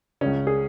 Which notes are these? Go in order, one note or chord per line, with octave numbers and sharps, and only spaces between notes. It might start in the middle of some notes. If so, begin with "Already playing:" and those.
C#2 C#3 C#4
G#4